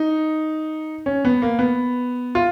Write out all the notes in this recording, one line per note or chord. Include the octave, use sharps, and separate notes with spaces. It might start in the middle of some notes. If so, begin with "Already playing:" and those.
Already playing: D#4
C#4
B3
A#3
B3
F4